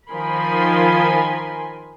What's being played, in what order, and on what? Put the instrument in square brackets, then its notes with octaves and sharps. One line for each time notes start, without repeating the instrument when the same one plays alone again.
[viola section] D#3 F3 A#4 G#5 B5 C6